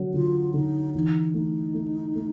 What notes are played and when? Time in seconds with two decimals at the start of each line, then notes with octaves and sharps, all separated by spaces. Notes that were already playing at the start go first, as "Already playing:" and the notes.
Already playing: D3 F#3
0.13 D3 F4
0.54 D3 D#4
0.95 E3 D#4
1.34 A3 D#4
1.75 A3
2.16 A3